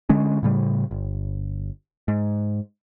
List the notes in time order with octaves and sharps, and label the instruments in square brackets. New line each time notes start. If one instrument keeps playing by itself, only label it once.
[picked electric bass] D3 G#3 C#4
A2 C#3 G3
G1
G#2